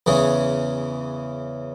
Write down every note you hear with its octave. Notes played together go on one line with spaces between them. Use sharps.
E2 C#3 E3 C#4 G#4